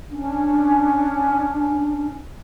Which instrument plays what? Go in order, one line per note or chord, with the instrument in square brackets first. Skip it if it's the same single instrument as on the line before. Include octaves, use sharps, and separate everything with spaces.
[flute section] C#4 D4